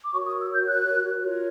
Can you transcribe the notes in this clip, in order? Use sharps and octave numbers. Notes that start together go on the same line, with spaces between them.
D6
F#4 A#4 C#5 C#6
D#6
E6
G6
F#6
F4 A#4 C#5